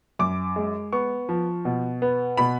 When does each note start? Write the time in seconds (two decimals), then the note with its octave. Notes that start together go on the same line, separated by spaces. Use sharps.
0.19 F#2 D6
0.56 G#3
0.93 B3 C#6
1.29 F3
1.65 B2
2.02 B3
2.37 B2 B5